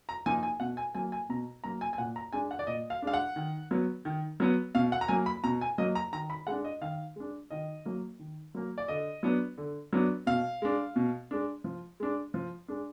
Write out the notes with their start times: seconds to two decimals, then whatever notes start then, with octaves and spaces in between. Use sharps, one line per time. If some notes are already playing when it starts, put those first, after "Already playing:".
0.09 A#5
0.26 F3 A#3 D#4 G#5
0.43 G#5
0.60 B2 F#5
0.77 G#5
0.95 F#3 A#3 G#5
1.12 G#5
1.29 B2 A#5
1.64 F#3 A#3 A#5
1.81 G#5
1.93 G#5
1.98 A#2 F#5
2.16 A#5
2.33 G#3 D4 G#5
2.51 F#5
2.59 D5
2.67 A#2 D#5
2.90 F5
3.02 G#3 D4 F5
3.14 F#5
3.36 D#3
3.71 F#3 B3
4.05 D#3
4.40 F#3 B3
4.75 B2 F5
4.92 F#5
5.01 A#5
5.08 F#3 A#3 G#5
5.26 B5
5.44 B2 A#5
5.61 G#5
5.78 F#3 A#3 D#5
5.95 A#5
6.13 D#3 A#5
6.30 B5
6.47 G#3 D4 F#5
6.64 D#5
6.81 D#3 F5
7.16 G#3 D4
7.50 D#3 D#5
7.85 F#3 A#3
8.19 D#3
8.55 F#3 A#3
8.78 D5
8.88 D3 D#5
9.23 F#3 B3 D4
9.58 D3
9.93 F#3 B3 D4
10.27 B2 F5
10.62 G#3 D4
10.96 B2
11.31 G#3 D4
11.64 F3
12.00 G#3 D4
12.34 F3
12.68 G#3 D4